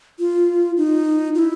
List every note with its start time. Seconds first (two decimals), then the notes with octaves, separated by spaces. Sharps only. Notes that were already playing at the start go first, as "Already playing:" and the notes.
0.19 F4
0.77 D#4
1.35 F4
1.39 E4